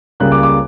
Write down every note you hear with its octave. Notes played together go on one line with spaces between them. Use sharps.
C#2 C#3 G3 A#3 F#6
D6
D6